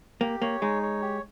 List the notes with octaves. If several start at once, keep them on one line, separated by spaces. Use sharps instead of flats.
A#3 G4
A#3 C#5
G#3 D#4
C#5
G4